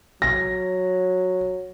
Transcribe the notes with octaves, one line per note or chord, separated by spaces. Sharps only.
F#3 A#6